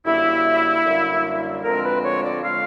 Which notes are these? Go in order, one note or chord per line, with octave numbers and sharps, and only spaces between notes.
F#2 D3 G3 A#3 E4
F#2 D3 G3 A#3
D2 D3 F3 G#3 C4 A#4
B4
C#5
D5
D3 F3 G#3 C4 F5